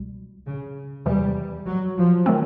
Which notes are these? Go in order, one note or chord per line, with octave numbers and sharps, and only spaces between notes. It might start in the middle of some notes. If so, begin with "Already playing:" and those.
Already playing: C#2 B2 G3
C#3
E2 C3 E3 G3
F#3
F3
D#3 F#3 A3 C4